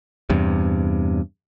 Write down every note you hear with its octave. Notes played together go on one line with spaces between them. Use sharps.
E2 G2 C3